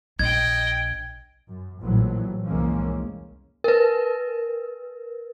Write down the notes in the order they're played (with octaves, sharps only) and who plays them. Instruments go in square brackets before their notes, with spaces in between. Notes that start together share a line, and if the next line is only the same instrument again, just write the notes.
[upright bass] A#1 [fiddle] D#5 G5 [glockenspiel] G#6
[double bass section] F#2
A#1 A2 E3 F#3
C2 F2 E3 G#3 A#3 C#4
[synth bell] A#4 B4